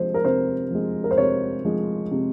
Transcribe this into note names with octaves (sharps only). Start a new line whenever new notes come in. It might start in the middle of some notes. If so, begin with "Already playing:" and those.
Already playing: C3 F3 G#3 C5
A#4
C3 C5
F3 G#3
A#4
C5
C3 C#5
F3 G#3
C3